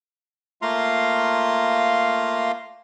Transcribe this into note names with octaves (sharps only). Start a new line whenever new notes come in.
A3 A#3 F4 F5 A#5 C6